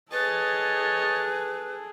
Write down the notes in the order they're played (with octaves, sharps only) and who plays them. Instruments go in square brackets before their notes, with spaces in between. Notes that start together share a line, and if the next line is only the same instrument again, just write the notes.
[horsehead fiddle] G#4 A4 [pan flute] B4 [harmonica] C#5 D#5 [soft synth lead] A6